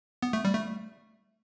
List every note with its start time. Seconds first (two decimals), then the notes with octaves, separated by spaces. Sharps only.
0.23 B3
0.33 A3
0.45 G3
0.54 A3